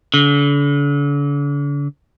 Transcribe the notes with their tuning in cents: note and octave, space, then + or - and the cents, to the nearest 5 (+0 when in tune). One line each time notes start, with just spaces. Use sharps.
D3 -40